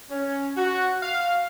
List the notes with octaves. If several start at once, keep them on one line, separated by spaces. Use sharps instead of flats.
C#4
F#4
F5